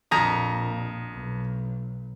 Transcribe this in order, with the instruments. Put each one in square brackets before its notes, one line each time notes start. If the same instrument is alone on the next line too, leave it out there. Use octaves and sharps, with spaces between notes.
[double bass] A#1 A#2 [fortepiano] F2 A#5 D#6
[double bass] B1